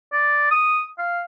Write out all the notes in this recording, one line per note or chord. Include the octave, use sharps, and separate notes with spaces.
D5
D#6
F5